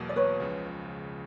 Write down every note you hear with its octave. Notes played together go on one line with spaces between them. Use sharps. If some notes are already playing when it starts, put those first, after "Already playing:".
Already playing: E2 B2 F#3 A#3
D5
B4 C#5
C#2 C#3 F3